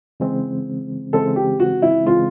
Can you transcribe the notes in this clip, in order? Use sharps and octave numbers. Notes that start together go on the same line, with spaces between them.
C#3 E3 G#3 C4
C#3 E3 G#3 C4 A4
G4
F#4
E4
C#3 E3 G#3 C4 F4